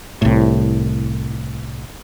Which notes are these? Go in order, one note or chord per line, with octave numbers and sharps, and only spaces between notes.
C2 A2